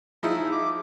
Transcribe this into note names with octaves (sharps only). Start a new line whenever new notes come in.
F3 D#4 E4 G#4
D6